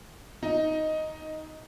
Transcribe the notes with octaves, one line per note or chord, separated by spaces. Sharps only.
D#4